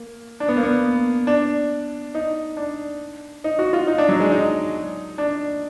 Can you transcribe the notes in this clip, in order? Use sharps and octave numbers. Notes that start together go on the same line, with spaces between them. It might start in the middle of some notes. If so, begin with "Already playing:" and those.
Already playing: A#3
D4
B3
A#3
B3
D4
D#4
D4
D#4
F#4
F4
D#4
D4
F#3
G#3
D#4
D4